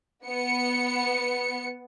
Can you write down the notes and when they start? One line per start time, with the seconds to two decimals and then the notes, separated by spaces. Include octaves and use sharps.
0.25 B3 C#7